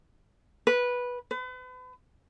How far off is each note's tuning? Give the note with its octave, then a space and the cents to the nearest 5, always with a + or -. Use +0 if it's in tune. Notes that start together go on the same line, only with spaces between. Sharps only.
B4 -10
B4 +40